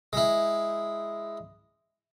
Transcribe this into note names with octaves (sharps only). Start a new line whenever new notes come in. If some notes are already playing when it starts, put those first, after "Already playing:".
G#3 E4